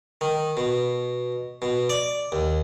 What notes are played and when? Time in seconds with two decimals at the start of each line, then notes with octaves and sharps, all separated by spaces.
0.21 D#3
0.57 B2
1.62 B2
1.89 D5
2.32 D#2